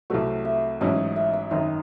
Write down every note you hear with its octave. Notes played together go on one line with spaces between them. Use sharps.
C2 C3 F#3 A3 F#4
E5
A1 G#2 F#3 C#4 E4 D#5
E5
E5
G#1 F#2 D#3 D#5